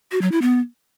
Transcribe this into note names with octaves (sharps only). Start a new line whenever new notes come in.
F#4
F#3
E4
B3